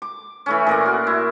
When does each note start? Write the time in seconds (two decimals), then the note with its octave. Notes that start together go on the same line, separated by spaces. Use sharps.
0.02 D6
0.46 E3 A3 C#4
0.67 A#2 A#4 D5
0.85 F#4
1.07 E4